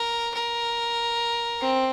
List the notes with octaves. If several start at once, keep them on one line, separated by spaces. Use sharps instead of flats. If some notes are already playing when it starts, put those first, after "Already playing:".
Already playing: A#4
A#4
C4